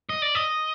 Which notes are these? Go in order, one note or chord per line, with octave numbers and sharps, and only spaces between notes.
D#5
D5
D#5